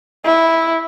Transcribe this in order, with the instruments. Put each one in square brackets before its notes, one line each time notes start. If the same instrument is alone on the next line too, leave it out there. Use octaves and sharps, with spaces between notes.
[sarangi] E4